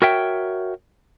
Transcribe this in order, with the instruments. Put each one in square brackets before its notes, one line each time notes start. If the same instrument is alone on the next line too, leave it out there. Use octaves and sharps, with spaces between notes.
[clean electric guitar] F#4 A#4 C#5 E5 G5